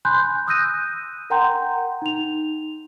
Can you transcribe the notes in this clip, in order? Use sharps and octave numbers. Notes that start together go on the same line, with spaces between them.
G#5 B5 C6 F#6 G6
D#6 E6 F#6 G6 A#6 D#7
A#4 F#5 G5 A#5 C6 G6
D#4 F7